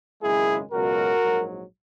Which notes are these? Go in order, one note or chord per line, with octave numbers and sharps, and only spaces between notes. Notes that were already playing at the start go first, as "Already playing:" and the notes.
G#1 F#2 C#3 G#3 E4 G#4
C#2 B2 F#3 B3 F#4 A#4
A#1 G#2 F#3